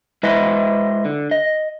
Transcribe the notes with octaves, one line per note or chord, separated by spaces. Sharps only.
G#3 E4 B4 C5 D#5 E5
D3
D#5